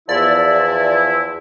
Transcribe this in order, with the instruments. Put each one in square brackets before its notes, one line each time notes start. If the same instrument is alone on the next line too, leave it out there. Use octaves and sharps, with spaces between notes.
[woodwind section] E2 F3 E4 [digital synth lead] D5